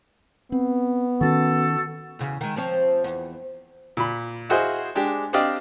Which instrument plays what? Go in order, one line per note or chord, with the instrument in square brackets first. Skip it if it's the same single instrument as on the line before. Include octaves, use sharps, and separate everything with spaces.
[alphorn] B3 [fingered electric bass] C4
[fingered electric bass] D#3 C4 C#4 [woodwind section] F#4 A4
[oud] E2 C#3
D#3 G#3
F3 C4 C#5
E2
[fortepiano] A#2 B5
E4 F#4 G#4 C5 D#5 F5
G#3 D4 G4
C4 D4 G4 D5 D#5 F5